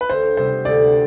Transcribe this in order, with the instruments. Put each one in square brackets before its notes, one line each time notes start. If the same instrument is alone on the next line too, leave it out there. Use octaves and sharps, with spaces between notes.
[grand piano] B4
[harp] D2 [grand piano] C5
[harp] C3 G3 B3 [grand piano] C5
[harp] D2 [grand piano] D5